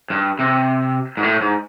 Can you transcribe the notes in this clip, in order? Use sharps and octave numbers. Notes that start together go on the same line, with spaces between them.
G2
C3
G#2
A2
G#2